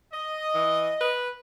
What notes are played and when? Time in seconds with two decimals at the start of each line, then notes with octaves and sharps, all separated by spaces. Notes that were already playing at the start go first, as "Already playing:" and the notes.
0.12 D#5
0.55 E3
1.01 B4